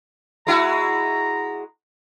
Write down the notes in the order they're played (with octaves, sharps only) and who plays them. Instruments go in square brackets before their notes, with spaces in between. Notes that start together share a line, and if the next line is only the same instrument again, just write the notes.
[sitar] G#3 E4 F#4 [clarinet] A#5